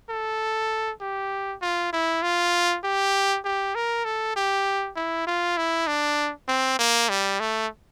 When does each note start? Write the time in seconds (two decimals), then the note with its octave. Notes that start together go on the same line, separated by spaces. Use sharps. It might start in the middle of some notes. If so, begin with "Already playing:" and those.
0.09 A4
1.01 G4
1.62 F4
1.93 E4
2.23 F4
2.84 G4
3.45 G4
3.75 A#4
4.05 A4
4.36 G4
4.96 E4
5.27 F4
5.57 E4
5.87 D4
6.48 C4
6.79 A#3
7.09 G3
7.40 A3